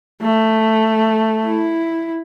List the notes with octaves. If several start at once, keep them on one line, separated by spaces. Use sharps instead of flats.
A3
E4